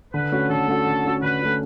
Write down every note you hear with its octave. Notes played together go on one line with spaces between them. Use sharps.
D3 B4
A3 C#4 F#4
D3 A4
A3 C#4 F#4
D3
A3 C#4 F#4
D3 B4
A3 C#4 F#4